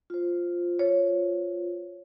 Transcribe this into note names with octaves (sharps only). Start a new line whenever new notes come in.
F4 C5
C#5